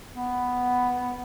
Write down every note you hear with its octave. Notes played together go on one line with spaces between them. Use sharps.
B3